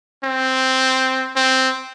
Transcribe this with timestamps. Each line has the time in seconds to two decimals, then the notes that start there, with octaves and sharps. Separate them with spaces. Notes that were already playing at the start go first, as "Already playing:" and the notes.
0.24 C4
1.36 C4